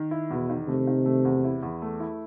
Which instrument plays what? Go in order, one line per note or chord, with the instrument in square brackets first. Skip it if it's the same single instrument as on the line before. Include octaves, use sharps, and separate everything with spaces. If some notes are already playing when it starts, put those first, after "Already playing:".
Already playing: [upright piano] D#3
E4
[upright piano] E2 [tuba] B2
[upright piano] D#3
[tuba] C3 [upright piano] A3
[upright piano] D#3
A3
E2
E4
E2
A3
E4